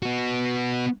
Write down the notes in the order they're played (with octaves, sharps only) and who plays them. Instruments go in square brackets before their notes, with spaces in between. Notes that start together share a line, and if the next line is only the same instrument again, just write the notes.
[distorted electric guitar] B3 F#4